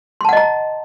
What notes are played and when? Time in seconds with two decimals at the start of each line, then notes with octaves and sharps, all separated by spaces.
0.21 C6
0.25 A5
0.29 F#5
0.33 D#5
0.37 A#5